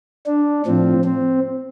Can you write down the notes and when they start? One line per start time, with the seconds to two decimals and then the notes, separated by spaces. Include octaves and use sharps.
0.26 D4
0.66 A2 F3 C4
1.05 C4